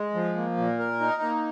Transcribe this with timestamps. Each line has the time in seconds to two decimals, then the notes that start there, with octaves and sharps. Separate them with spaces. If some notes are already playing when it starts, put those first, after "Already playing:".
Already playing: G#3
0.14 F3
0.36 A#3
0.57 A#2
0.79 A#4
1.00 D#4
1.22 A#3